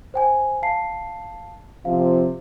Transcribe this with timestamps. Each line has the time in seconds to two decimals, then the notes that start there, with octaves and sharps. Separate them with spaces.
0.14 C5 G5 G#5
0.62 F5 A5 C7
1.85 C3 F3 F5